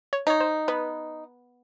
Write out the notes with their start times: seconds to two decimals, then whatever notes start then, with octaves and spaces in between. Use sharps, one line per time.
0.13 C#5
0.27 D#4 C#5
0.40 C5
0.68 B3 B4